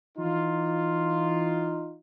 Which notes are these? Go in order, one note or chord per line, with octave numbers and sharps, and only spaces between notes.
E3 D#4 F4